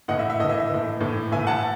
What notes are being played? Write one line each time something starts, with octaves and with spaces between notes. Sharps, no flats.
A2 E3 D#5 F#5
E5
E5
A2 E3 D#5
E5
E5
A2 E3
A2 E3
A2 E3 E5 G#5
F#5 A5